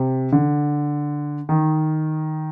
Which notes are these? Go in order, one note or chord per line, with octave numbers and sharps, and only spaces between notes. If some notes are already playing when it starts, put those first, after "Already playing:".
Already playing: C3
D3
D#3